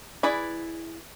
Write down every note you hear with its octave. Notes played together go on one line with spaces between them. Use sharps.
E4 G#4 B4 D5